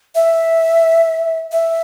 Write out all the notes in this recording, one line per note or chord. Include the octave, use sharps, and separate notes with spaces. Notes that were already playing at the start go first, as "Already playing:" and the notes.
E5
E5